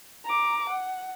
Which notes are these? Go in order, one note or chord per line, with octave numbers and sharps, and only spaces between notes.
A#5 D6
F#5